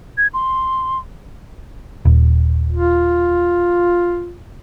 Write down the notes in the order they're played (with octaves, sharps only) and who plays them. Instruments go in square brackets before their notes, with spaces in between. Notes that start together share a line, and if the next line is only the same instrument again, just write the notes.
[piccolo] G#6
C6
[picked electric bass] D#1
[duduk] F4